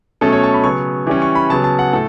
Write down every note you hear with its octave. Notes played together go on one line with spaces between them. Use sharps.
B2 F#3 A3 C#4 A4
C#5
A5
B5
C#3 F#3 B3 C#6
E3 G3 C#4 D6
C#6
B5
C#3 F#3 B3 A5
A5
F#5
A2 A4